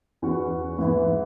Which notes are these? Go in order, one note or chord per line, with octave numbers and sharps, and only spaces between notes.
E2 E3 C#4 F#4
G#2 E3 B3 E4